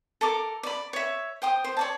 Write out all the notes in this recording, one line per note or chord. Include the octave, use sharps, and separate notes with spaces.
A4 A#4 D6
D5 B5
C#5 E5
C5 G5 D#6
C5
C#5 D5 A5